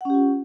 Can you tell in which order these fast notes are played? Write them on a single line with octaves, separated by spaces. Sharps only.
F#5 C#4 G4 F4